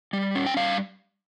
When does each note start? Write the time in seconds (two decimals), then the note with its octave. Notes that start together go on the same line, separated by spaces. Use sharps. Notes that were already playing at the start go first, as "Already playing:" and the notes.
0.13 G3
0.35 C#4
0.46 G5
0.57 G3 F5